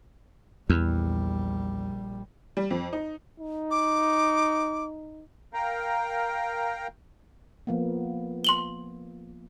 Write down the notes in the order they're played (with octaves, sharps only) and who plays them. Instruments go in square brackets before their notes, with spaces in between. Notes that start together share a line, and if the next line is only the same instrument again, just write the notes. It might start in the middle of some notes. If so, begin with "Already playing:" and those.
[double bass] A#1 G3 [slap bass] E2
[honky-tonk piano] G3
F2
D#4
[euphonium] D#4
[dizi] D6
[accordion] A#4 F5 G5 A#5
[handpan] F3 A#3 B3
[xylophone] C6 F#7 G7